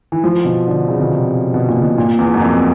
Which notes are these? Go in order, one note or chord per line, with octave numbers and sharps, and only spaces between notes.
E3
F3
B2
D3
C#3
B2
C3
B2
A#2
B2
A#2
E2
F#2
F2